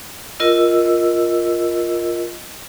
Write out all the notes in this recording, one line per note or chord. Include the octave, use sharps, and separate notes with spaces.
F4 A#4 D#5 E6